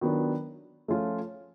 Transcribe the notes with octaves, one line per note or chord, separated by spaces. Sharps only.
D#3 F#3 B3 D4 F4
F3 A3 C#4 F4